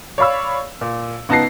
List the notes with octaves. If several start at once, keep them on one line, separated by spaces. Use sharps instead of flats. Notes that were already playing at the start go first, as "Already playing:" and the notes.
C#5 D5 F5 B5 E6
A#2
C#2 B3 D#4 A5 A#6 C7